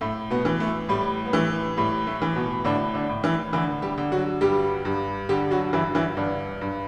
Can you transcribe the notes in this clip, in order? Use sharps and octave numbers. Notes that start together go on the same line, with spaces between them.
A2 A3
B2 B3
E3
A3
A2 G3
B3
E3 A3
A2 G3
A3
E3
B2 B3
A2 D3 D4
D3 D4
A2
E3 E4
D3 E3 E4
G3 G4
D3
F#3 F#4
G2 G3 G4
G2
D3 G3 G4
F#3 F#4
G2 E3 E4
E3 E4
G2 D3 D4
G2